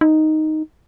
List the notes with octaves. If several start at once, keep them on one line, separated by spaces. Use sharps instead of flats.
D#4